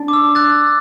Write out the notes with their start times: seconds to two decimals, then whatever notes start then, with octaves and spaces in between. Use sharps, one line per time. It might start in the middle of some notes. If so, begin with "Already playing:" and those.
Already playing: D4
0.08 D6
0.13 E6
0.35 F#6 A6